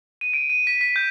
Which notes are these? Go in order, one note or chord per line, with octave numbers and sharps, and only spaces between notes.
D#7
D7
D#7
B6
B6
G6